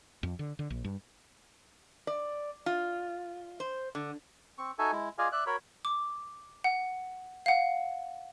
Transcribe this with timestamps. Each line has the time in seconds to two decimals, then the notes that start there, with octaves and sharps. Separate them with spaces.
0.23 F2
0.39 D3
0.59 D3
0.70 A#1
0.85 G2
2.07 D5
2.66 F4
3.60 C5
3.95 D3
4.58 C4 C#6
4.79 D#4 F#4 A4 E5 G#5
4.92 G#3 E4
5.18 F4 G#4 D5 D#5 F5 G#5
5.32 D5 E5 F#6
5.46 F#4 A#4 C#5 B5
5.85 D6
6.64 F#5
7.46 F5 F#5